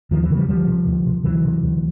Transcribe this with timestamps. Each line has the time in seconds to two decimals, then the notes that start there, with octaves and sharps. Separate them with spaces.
0.11 D#2 D#3 F3
0.23 E3 F#3
0.30 C#3
0.36 F3 G3
0.48 D2 F3 G3
0.67 C3
0.87 D2
1.06 C3
1.24 D2 E3 F#3
1.44 C3
1.63 D2